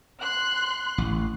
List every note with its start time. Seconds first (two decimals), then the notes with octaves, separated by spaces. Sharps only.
0.20 C6 F#6
0.98 A1